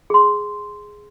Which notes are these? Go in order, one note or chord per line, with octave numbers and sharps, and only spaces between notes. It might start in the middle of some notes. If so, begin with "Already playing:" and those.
G#4 C6